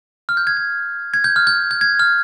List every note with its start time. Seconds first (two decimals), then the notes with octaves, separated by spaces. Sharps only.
0.29 F6
0.37 G6
0.47 G#6
0.57 G#6
1.14 G#6
1.24 G6
1.36 F6
1.47 G6
1.71 G6
1.81 G#6
2.00 F6